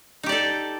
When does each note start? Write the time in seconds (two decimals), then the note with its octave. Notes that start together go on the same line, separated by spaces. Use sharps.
0.23 D#4
0.26 G4
0.29 D5
0.32 A4